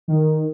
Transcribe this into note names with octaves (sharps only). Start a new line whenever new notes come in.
D#3